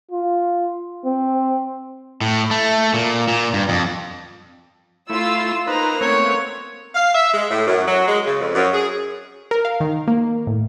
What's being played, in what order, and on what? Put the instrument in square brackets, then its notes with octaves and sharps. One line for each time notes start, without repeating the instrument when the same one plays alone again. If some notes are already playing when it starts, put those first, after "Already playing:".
[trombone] F4
C4
[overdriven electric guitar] A2
A3
A#2
A#2
G2
F2
[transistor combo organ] A3 E4 [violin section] F4 E6
[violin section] A#3 [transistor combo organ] D#4 B4 [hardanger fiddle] C5 A#5
[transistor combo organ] A3 B3 C4 [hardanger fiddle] C#5
[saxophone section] F5
E5
G#3
A2
F#2
F#3
G#3
C#3
F2
F#2
G#4
[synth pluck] A#4
F5
D#3
A#3
A2